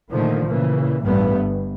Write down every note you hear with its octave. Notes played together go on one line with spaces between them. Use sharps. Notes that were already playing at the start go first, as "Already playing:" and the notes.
A#2 D3 D#3 F3 A3
A#2 C#3 E3
A1 G2 G3 A3 B3
G1